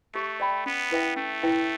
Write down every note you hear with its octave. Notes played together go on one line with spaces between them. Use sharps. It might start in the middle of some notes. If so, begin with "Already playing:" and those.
A3 G4
D5 G5 B5
B3 C#4
E4 B4 E5 G5
A3 C#4
E4 B4 E5 G5